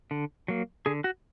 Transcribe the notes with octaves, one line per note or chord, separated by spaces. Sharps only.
D3
F#3 A#3
D3 G#4
F#4